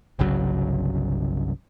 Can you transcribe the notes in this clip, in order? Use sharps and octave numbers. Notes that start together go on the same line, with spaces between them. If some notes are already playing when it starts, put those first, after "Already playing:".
G1 C2 C#3 F#3